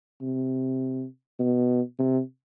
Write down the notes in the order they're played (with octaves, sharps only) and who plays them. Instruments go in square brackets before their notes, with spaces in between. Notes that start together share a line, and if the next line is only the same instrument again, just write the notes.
[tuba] C3
B2
C3